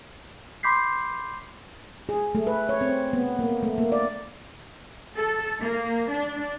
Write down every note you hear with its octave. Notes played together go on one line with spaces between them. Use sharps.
B5 C6 D6 G6 B6 C7
G#4
A3
B4
C#5
C4
B3
A#3
A3
A#3
D5
A4
A#3
D4